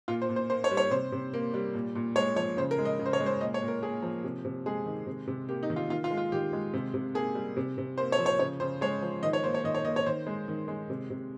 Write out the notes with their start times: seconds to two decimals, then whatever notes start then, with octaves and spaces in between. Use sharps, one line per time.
0.08 A#2 F4
0.22 C5
0.29 A#2
0.36 C5
0.50 A#3 C5
0.64 C#5
0.71 G3
0.77 C#5
0.91 C3 C5
1.12 C3
1.33 A#3
1.54 G3
1.74 A#2
1.95 A#2
2.16 G#3 C#5
2.36 F3 C#5
2.57 C#3 C5
2.71 A#4
2.78 G#3
2.85 D#5
2.99 C#3
3.06 C5
3.13 C#5
3.20 G#3
3.26 C5
3.41 A#2 D#5
3.54 C#5
3.62 A#2
3.68 A#4
3.82 A#3 G#4
4.03 F3
4.24 C3
4.45 C3
4.66 G#3 G#4
4.86 D#3
5.07 C3
5.27 C3
5.49 A#3 G4
5.63 D#4
5.70 D#3
5.76 F4
5.90 D#3 F4
6.04 F4
6.11 G#3
6.17 F4
6.32 D#3 G4
6.53 G#3
6.74 C3
6.94 C3
7.14 A#3 G#4
7.35 G3
7.57 C3
7.78 C3
7.98 A#3 C5
8.12 C#5
8.18 F3
8.26 C#5
8.39 C#3 C#5
8.60 C#3 C5
8.81 G#3 C#5
9.02 F3
9.23 D#3 D#5
9.33 C#5
9.43 A#3 C5
9.54 C#5
9.64 D#3 D#5
9.74 C#5
9.85 A#3 D#5
9.96 C#5
10.06 D#3 C5
10.27 G#3
10.48 D#3
10.68 G#3
10.90 C3
11.10 C3